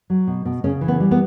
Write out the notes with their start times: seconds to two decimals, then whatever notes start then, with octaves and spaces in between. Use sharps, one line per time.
0.10 F#3
0.27 B2
0.45 B2
0.64 C#3 C#4
0.81 E3
0.88 B3
1.00 G3
1.11 B3